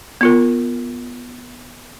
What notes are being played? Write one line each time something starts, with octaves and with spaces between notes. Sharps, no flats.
B3 F4 A#4